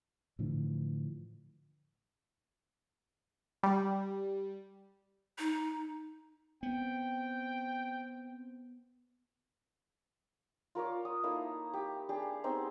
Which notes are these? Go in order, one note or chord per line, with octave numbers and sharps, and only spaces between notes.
A2 D3 E3 F3
G3
D#4
B3 C4 G5
F4 A#4 C#5 D5
D#6
A#3 D#4 E4 A4
G4
D4 G4 G#4
B3 C4 D#4 C5